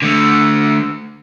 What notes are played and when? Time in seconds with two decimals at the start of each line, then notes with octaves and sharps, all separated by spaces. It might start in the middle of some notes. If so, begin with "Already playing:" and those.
0.02 D3 A3